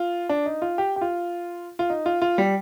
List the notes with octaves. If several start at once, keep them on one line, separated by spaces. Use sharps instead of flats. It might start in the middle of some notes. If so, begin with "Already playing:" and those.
Already playing: F4
D4
D#4
F4
G4
G4
F4
F4
D#4
F4
F4
G3